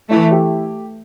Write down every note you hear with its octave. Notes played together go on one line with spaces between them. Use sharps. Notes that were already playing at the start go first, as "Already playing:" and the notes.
E3 A3 E4
G4